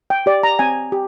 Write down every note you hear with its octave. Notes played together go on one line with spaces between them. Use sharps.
G5
G4 D5
A#5
C4 G#5
G4